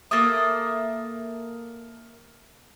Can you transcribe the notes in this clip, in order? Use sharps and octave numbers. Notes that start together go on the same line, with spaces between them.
A#3 A4 E5 D#6